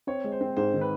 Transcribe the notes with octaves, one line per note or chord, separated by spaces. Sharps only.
C4 C#5
G#3
C5
C4
G#2 C5
D#3
B4